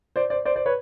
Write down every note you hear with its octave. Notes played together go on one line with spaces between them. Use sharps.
C5 D5
C5 D5
C5 D5
C5 D5
B4 C#5